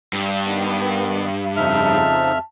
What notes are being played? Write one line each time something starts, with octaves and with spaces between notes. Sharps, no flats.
G2
D#3 B3 G4
F2 C#3 F3 D#4 E5 A5 F6